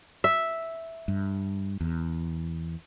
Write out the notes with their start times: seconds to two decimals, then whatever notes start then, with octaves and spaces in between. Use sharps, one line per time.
0.24 E5
1.08 G2
1.81 E2